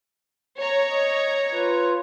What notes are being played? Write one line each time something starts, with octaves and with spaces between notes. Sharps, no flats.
C#5 A#5
D#5
F4 B4